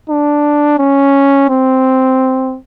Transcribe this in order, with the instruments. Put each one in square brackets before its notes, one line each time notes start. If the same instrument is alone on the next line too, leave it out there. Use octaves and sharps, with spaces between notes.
[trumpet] D4
C#4
C4